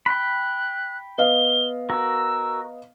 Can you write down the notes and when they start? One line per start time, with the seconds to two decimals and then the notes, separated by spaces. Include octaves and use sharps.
0.06 G5 B5 F#6
1.18 B3 D#5 F5 G7
1.90 F#4 A#4 E6